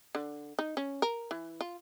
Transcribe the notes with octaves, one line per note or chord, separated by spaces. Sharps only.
D3
D#4
C#4
A#4
E3
F4